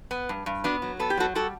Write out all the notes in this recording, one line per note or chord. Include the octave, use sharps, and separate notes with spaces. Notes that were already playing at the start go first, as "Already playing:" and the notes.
B3
G2
G2
B3 D4 F#4
F#3
B3 A4
G4
F#3 F#4 A4
G3 F#4 A4